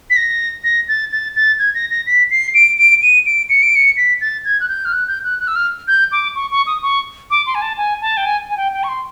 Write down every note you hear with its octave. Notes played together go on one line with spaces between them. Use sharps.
B6
A#6
A#6
A6
A6
A6
G#6
A#6
A#6
B6
C7
D7
D7
D#7
D7
C#7
D7
C#7
B6
A6
G#6
F#6
G6
F6
F#6
G6
F#6
F#6
E6
F6
G6
D6
C#6
C#6
D#6
C#6
D6
C6
G#5
A5
G#5
A5
G5
G#5
G#5
G5
G5
C#6
C6